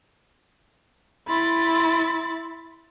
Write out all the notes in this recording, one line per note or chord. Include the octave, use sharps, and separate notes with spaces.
E4 B5 C6 A6